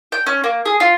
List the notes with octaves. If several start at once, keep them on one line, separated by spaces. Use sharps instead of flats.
G5
C#4
A#3
G#4
F4